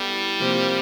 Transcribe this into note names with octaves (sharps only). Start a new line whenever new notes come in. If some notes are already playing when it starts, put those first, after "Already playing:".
Already playing: G3 B3 E4 A4
C3 F3 A#3